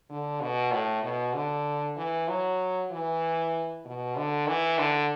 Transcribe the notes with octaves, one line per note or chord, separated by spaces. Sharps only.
D3
B2
A2
B2
D3
E3
F#3
E3
B2
D3
E3
D3